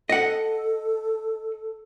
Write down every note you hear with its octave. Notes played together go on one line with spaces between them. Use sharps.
A4 D#5 F#5